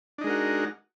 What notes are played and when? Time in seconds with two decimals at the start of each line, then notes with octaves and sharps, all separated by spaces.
0.18 D4
0.21 D#4
0.24 G#3
0.27 A#4
0.30 F#4